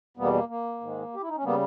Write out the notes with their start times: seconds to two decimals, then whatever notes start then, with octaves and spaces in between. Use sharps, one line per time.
0.17 E2 B2 G3 A#3 B3
0.34 A#3
0.49 A#3
0.81 G#2 D#3 G#3
1.14 G4
1.22 E4
1.29 D#4
1.37 C#4
1.44 C#3 G3 A#3 B3